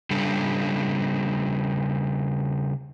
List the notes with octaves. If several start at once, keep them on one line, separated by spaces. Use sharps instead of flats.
C#3 G3 D4 A4